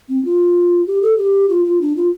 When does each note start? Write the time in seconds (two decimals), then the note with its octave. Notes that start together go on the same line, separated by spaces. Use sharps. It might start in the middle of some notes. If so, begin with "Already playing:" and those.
0.09 C4
0.25 F4
0.87 G4
1.03 A4
1.18 G4
1.49 F4
1.65 F4
1.81 D4
1.97 F4